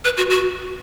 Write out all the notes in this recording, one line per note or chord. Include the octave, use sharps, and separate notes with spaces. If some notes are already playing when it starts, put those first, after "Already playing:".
B4
F#4
F#4